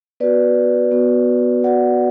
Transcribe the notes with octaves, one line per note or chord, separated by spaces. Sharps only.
B3 F#4 B4 D5
B3 F#4
B3 F#4 D5 F#5